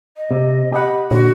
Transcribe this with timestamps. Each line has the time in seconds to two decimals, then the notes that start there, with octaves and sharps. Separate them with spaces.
0.17 D#5
0.31 C3
0.72 G4 D#5 F#5 B5
1.11 A#2 D3 F#4